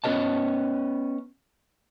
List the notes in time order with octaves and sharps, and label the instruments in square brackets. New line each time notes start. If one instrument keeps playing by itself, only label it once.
[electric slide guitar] B3 C#4 G#4 A#4 D#5 A5